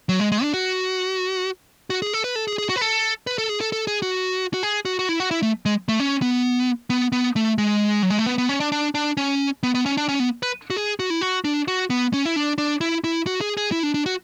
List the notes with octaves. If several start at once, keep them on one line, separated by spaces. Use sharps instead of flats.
F#3
G#3
G#3
D4
F#4
F#4
G#4
A4
B4
A4
G#4
G#4
F#4
B4
A4
B4
A4
G#4
A4
A4
G#4
F#4
F#4
G#4
F#4
F#4
E4
F#4
E4
A3
G#3
A3
C#4
B3
B3
B3
A3
G#3
F#3
G#3
A3
B3
B3
C#4
D4
D4
D4
C#4
B3
B3
C#4
D4
C#4
B3
B4
F#4
G#4
F#4
E4
F#4
D4
F#4
B3
C#4
E4
D4
D4
E4
E4
F#4
G#4
G#4
E4
D4
D4
F#4